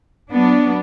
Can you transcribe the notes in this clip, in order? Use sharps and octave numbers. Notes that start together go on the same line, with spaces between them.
F#3 B3 D4